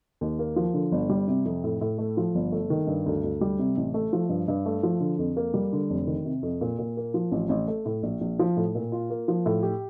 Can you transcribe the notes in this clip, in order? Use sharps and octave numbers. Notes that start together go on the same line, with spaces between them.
D#2
A#3
F3
D3
G1
G3
C3
F2
A2
A2
A3
F3
G1
A3
D#3
G2
D2
D2
G3
C3
A1
A3
F3
G2
G2
A3
F3
D3
F2
A#3
G3
D3
F1
D#3
C3
F2
A#2
A#2
A#3
F3
A1
A1
A3
A2
A#1
A#1
F3
A2
A#2
F4
A#3
F3
A2
G4